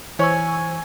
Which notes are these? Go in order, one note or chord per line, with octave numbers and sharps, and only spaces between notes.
E3 C5 C#5 G#5 C#6 E6